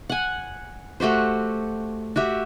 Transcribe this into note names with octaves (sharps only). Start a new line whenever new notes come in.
F#5 G#5
A3 F#4 G4 C5
F#4 G4 E5